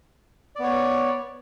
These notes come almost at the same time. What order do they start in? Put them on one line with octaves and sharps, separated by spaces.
D5 B3 C#5